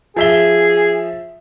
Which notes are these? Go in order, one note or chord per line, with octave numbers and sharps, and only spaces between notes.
F3 G#4 E5 G7